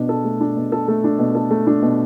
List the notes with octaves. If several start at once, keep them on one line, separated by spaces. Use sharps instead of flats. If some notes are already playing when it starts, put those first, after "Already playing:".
Already playing: B2 D4
A4
A3
D4
B2
A4
A3
D4
B2
A4
A3
D4
B2